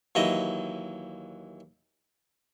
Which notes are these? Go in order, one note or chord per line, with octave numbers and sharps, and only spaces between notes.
D#2 E3 F#3 D#5